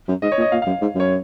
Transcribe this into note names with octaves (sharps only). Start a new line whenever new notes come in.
F#2
G#2 D#5
C#5
A#2
D#5
A#2 F5
F5
F#2
G#2
F#2 C#5